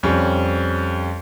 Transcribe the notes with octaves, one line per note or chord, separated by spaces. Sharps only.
F2 G3 C#4